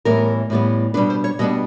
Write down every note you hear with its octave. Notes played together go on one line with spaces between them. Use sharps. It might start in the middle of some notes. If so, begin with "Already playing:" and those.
A2 E3 G3 B3 A#4
A2 E3 G3 B3
B2 G3 B3 D4 B4
C5
C#5
B2 G3 B3 D4 D#5